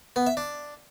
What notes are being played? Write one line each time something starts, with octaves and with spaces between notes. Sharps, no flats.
B3
E5
D4